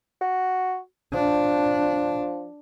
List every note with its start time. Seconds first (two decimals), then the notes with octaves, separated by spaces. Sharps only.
0.21 F#4
1.14 F3 D4